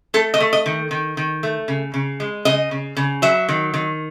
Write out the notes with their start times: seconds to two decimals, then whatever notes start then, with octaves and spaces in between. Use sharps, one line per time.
0.14 A3 A4
0.34 D#5
0.40 A3
0.53 D#5
0.66 D#3
0.91 D#3
1.17 D#3
1.43 A3
1.68 C#3
1.94 C#3
2.20 G#3
2.45 C#3 D#5
2.71 C#3
2.97 C#3
3.22 F#3 E5
3.49 D#3
3.74 D#3